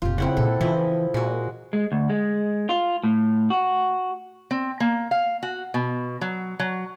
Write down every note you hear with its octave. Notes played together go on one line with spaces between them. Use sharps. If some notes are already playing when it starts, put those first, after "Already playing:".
F1 A#2 F4 G4
C#3 C4 E4 F#5
A#2 D#4 A4
C#3 E3 F3 E4 D#5
A#2 G#3 F#4
G#3
D2
G#3
F4
A2
F#4
C4
A#3
F5
F#4
B2
F#3
F#3